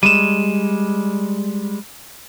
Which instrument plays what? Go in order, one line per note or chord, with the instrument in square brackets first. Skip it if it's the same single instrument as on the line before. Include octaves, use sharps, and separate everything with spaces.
[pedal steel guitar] G3 G#3 [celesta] D#7 E7